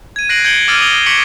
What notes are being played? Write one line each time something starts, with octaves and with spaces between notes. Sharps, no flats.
G#6 D#7
F#6 A#6 C7 D7 F#7
G6 G#6 C#7 D7 F#7 G7
D6 E6 F6 A6 D#7
D#6 F7 G7
C#6 D6 B6 C#7 D7 F#7